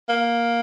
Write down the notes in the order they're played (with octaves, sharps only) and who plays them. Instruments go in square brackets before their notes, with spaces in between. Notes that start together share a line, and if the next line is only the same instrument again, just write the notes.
[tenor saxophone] A#3